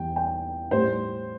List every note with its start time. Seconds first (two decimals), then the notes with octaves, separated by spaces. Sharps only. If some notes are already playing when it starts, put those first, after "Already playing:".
Already playing: E2 E3 G3 G5
0.16 G5
0.71 A2 G3 C5